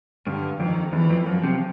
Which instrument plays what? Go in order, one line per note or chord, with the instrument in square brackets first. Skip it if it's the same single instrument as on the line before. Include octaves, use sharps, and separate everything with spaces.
[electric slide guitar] G2 [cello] D3
[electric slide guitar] F2 [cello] D#3
[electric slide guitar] E2 [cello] E3
[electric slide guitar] F2
[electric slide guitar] F#2 [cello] F3
[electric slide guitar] C3